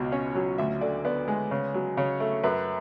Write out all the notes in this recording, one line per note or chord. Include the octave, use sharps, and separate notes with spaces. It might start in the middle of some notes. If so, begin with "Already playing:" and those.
Already playing: C#2 B2
C#4 C#5
F#3
D2 E5
D3 D5
B3 D5
G#3
C#3
F#3
C#3 C#5
A3
F#2 B4